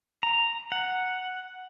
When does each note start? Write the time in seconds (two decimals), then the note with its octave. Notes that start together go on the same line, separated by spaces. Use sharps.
0.23 A#5
0.72 F#5